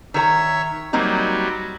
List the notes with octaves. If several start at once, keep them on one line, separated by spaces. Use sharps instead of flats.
D#3 A#4 C#5 E5 A#5 E6
F#3 G3 A#3 C4 D#4